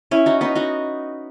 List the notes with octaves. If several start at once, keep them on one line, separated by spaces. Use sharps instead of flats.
C#4 E4
D#4 F#4
B3 D#4
D#4 F#4